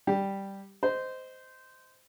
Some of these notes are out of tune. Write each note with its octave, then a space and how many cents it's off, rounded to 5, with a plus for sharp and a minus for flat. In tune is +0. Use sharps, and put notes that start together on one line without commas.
G3 +0 G4 +0
C5 -15 D#5 +0